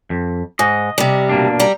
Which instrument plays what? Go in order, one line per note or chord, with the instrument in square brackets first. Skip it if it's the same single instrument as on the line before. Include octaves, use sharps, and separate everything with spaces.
[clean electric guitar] F2
[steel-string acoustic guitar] G#2 [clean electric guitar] D#5
[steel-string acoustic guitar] C3 G3
[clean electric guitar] B2 A#3 D4
[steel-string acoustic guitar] G3 A#5